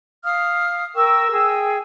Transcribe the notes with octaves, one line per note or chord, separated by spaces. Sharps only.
F5 D#6 F6
A#4 G5 C#6 E6
G#4 G5